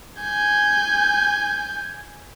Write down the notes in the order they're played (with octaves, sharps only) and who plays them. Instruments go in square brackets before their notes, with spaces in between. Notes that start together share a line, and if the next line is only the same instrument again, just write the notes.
[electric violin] G#5 G6